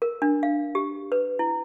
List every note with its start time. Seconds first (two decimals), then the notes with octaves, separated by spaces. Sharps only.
0.02 A#4
0.22 D4
0.43 F5
0.75 G4
1.12 B4
1.39 E4